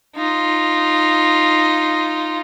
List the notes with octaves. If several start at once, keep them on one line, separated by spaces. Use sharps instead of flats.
D#4 F4